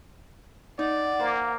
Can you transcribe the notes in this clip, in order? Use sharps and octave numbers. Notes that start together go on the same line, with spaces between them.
D#4 D5 F#5
A#3 C5